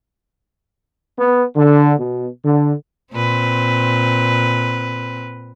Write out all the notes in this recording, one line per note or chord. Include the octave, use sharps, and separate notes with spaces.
B3
D3
B2
D3
A#2 C4 B4